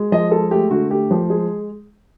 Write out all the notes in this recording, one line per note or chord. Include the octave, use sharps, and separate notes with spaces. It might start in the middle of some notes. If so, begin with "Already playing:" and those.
Already playing: G#3
F3 D#5
G#3 A4
A3 G4
D3 F#4
A3 G4
F3
G#3 G#4